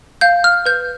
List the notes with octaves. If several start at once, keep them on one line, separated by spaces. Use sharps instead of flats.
F5 G6
F6
B4 G6